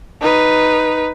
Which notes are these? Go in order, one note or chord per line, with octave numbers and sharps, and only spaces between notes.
D#4 B4